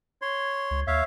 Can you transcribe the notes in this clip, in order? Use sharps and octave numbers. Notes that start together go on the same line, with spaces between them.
C#5 C6
C#2
D#2 C#5 E5 F5